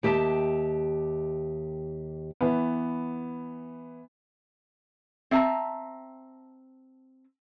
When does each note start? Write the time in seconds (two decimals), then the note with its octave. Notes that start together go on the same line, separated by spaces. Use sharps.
0.03 D#2 G4 E5 A5
2.41 E3 B3
5.31 C4 E5 A5 A#5